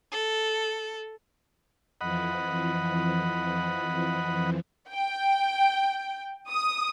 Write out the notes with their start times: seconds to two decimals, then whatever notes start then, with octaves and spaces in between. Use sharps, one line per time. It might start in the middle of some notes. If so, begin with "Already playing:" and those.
0.12 A4
2.01 F2 E3 F3 D#5 F#5 B5
4.89 G5
6.49 D#6